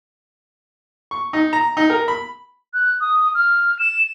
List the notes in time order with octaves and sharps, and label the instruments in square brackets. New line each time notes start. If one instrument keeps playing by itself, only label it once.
[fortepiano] C#6
D#4
A#5
D#4
A#4
B5
[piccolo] F#6
D#6
F6
E7